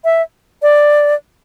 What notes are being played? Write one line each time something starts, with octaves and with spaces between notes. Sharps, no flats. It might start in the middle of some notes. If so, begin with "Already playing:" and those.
E5
D5